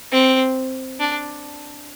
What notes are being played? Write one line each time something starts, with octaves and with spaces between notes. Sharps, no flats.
C4
D4